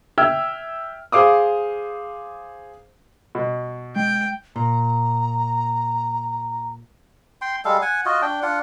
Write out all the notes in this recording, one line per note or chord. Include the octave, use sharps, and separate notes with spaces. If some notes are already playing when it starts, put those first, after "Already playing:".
E5 G5 E6 F6 G#6
G#4 C5 F5 D6 D#6
B2
G#3 G5
A#2 A#5
G5 C6
G3 G#3 A4 F5
F#5 G#5
F4 F#4 D#5
D4 G5
D4 F4 F#5